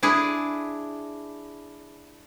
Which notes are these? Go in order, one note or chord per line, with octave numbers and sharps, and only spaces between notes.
D4 E4 G#4